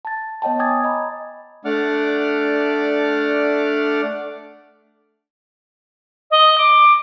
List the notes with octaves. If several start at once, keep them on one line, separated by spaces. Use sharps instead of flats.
A5 A6
B3 C#5 D#5 G5 A5
G#5 D6 D#6 G#6 A6
D#5 A#5 B5
A3 D4 D5 F#5 D6 F6
D#5
D6